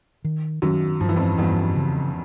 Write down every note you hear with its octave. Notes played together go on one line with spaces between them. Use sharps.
D#3
F#2 D#3 F#3
G2 F3
E3
F2 F3
E2 G2 E3
C#3